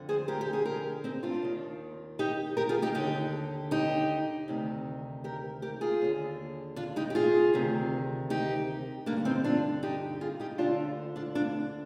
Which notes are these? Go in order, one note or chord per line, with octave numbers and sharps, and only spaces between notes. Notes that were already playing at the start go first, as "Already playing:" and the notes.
Already playing: F2 D3
G#4 C5
G4 A#4
G4
G#4
G4 A#4
C4 D#4
D4 F4
D#2 D#3
D#4 G4
G4 A#4
F4 G#4
D#4 G4
D#2 D3 D#4 G4
D#4 G4
D2 C3 D#3
G4 A#4
G4 A#4
F4 G#4
D#2 D3
D4 F4
D#4 G4
G4
F4 G#4
D2 C3 D#3
D#4 G4
G2 D3 A#3 D4
C4 D#4
D4 F4
D#4 G4
F4 G#4
D#4 G4
D2 D3 D4 F4
D4 F4
D4 F4